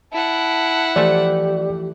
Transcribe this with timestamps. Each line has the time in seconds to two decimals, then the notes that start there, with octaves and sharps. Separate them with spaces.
0.13 E4 F#5 A5
0.96 E3 F3 A3 G4 D5